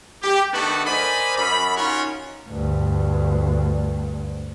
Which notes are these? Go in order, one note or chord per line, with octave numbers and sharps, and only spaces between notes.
G4
D#3 A3 B3 D4 F#4 A4
A#4 C5 D5 D#5 G#5 B5
F#2 B5
C#4 D#4 F4 F#4 A#4 C#5
D2 G2